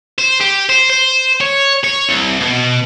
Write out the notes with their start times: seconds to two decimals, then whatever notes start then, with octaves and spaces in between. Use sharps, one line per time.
0.19 C5
0.41 G4
0.70 C5
0.90 C5
1.41 C#5
1.84 C#5
2.09 C2
2.40 B2